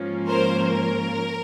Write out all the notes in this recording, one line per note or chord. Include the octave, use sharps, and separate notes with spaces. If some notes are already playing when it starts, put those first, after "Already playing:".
Already playing: G#2 F3 A#3 C#4 F4
A#4 C5
A#4